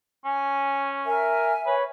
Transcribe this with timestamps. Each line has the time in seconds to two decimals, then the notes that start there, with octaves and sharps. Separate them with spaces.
0.25 C#4 G#5
1.06 A#4 E5 G#5
1.66 B4 C#5